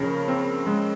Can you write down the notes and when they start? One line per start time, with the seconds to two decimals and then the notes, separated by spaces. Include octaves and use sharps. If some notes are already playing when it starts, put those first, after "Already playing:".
Already playing: F2 C#3 A#3 A#4
0.28 C4
0.67 G#3